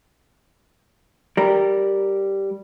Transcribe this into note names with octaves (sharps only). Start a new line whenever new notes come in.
G3 A#4